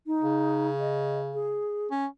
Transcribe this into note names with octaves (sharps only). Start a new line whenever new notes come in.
D#4
C#3
D#5
G#4
C#4